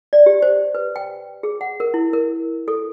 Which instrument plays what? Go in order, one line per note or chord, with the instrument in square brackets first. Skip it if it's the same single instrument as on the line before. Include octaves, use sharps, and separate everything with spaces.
[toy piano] D5
G4
C5
B4
G5
G#4
F#5
A#4
E4
A#4
A4